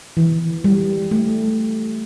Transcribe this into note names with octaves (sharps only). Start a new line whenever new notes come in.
E3
G3
A3